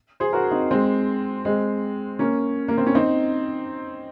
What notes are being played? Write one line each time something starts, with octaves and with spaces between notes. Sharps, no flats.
G#4 C5
F#4 A#4
C4 D#4
G#3 C4
G#3 C4
A#3 C#4
A#3
C4
C#4
C4 D#4